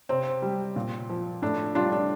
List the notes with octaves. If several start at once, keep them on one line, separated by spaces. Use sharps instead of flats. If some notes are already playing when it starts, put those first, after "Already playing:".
C3 C4
G3
A#2
F3
A2 D4
G3 D4 F4
D4